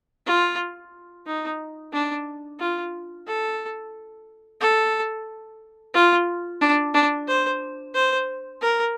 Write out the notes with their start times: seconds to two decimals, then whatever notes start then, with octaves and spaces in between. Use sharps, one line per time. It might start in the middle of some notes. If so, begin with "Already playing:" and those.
0.26 F4
1.27 D#4
1.93 D4
2.60 F4
3.27 A4
4.61 A4
5.94 F4
6.61 D4
6.94 D4
7.28 C5
7.94 C5
8.61 A#4